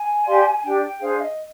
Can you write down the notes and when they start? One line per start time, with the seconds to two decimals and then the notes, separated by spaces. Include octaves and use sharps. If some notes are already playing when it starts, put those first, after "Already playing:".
Already playing: G#5
0.26 G4 D5 F5 C6
0.64 D4 G4 D5 G5
0.83 G5
1.01 D4 G#4 C5 F5
1.21 D#5